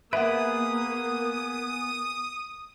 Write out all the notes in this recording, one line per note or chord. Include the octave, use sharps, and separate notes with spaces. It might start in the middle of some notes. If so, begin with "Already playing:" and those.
A#3 B3 G#4 B4 E5 F#5 D#6